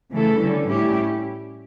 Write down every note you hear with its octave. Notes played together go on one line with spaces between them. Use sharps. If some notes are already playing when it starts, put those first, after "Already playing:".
C#3 E3 A3 E4 A4
D3 G3 C#4
A2 G3 C#4 E4 G4